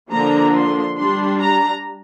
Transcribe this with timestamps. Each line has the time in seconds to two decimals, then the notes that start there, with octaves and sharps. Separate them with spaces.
0.11 D3 F3 A#3 D4 A#5
0.53 C6
0.97 G3 D4 C6
1.40 A#5